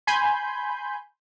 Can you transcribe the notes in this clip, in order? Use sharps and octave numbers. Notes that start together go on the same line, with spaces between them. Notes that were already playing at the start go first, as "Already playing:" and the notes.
G#5 B5 C6 G6